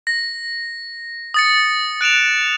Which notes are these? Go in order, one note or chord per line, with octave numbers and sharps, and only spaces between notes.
A#6
D#6 A6 C#7
F#6 D7 E7 F7